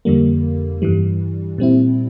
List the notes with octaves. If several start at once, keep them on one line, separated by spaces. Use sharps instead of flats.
F2 D3 G3 A#3
G2 E3 G3
A#2 G3 C4 E4